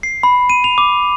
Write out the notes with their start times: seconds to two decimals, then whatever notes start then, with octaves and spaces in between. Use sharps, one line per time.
0.03 C7
0.23 B5
0.50 D#7
0.64 F7
0.78 D6